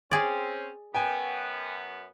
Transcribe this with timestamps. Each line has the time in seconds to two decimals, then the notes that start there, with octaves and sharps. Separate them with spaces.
0.11 C4 C#4 G#4 D5
0.94 F#2 B3 G5 G#5